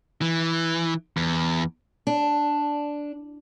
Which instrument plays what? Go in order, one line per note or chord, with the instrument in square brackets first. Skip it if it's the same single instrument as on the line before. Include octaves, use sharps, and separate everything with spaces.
[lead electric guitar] E3
E2
[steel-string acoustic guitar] D4